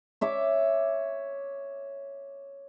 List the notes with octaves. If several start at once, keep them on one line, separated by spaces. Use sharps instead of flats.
C#5 E5 D6